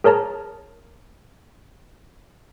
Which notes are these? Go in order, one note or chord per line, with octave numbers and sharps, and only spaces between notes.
G#4 A#4 C#5 A5 A#5